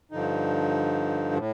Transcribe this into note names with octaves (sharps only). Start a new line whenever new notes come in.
G2 D3 F3 D#4
A2